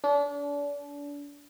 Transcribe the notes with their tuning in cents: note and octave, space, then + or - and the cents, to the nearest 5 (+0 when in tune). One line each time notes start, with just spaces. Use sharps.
D4 -35